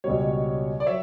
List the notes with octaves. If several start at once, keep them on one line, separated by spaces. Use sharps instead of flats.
C#2 B2 G3 C#5
D5
F#3 C#5 E5